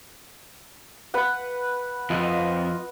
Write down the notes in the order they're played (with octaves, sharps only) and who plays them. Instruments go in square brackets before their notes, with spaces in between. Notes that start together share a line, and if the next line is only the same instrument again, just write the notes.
[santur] B4 F#5
[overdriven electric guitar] F2 [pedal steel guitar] F4 D#5 B5